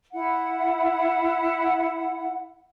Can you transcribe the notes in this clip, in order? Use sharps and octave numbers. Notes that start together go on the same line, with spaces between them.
E4 F#5